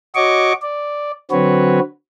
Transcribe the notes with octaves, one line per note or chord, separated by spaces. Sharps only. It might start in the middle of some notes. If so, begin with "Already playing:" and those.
F#4 C#5 D#5 C#6 D6
D5
D3 F#3 C4 F#4 B4 C#5